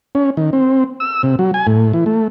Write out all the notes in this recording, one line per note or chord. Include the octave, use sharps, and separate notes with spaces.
C#4
D#3
C4
E6
C3
F#3
G#5
A2
E3
A3